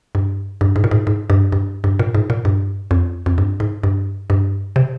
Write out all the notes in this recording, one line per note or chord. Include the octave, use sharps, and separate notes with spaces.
G2
G2
G#2
A#2
G#2
G#2
G2
G2
G2
A#2
G#2
A#2
G2
F2
F2
G2
G#2
G2
G2
C3